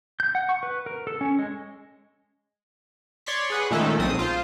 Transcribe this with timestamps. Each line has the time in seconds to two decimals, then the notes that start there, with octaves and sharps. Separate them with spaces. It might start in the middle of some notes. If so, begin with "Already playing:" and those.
0.20 G6
0.35 F#5
0.49 C#6
0.63 B4
0.86 A#4
1.07 A4
1.21 C#4
1.39 G#3
3.26 C#5 D5 C6 C#6 B6
3.50 G#4 B4 F#5
3.71 A#2 D#3 G#3 A3 C#4 A4
3.99 B1 C4 D#6
4.19 F4 C5